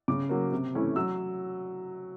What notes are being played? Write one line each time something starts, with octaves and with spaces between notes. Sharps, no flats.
C#3 D6
F#3 A#3
C3
E3 A3 C#4 E4
F#3 E6